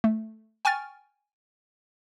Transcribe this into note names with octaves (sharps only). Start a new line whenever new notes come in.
A3
G5 G#5 C#6 F6 A6